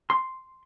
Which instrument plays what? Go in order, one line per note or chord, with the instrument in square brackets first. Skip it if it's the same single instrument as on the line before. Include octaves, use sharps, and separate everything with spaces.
[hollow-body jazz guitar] C6